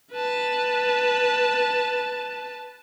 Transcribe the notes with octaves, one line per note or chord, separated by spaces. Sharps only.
B4 A5